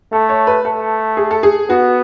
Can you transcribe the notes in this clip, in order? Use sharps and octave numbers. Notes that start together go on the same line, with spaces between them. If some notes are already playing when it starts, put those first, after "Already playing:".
A3 A4
C#5
B4
A3 A4
G#4
A4
G#4
B3 F#4